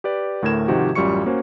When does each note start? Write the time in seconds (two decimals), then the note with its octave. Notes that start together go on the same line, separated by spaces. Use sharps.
0.04 G4 B4 D5
0.42 D2 A2 A3 A#4 G#6 E7
0.68 G#2 C3 D#3 F3 F#4 G4
0.95 A1 F#2 G3 F4 C#6 C#7
1.26 A#3 C#4 F#4 C5